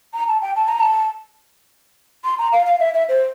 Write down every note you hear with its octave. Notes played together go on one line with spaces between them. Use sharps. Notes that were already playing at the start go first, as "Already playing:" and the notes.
A#5
A5
G5
A5
A#5
A5
C6
A#5
F5
F5
E5
E5
C5